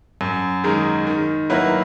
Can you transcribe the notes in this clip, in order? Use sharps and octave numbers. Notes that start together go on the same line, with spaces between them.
F#2
D#3 G#3 D#4 A#4
D#3
F#3 A#3 E4 B4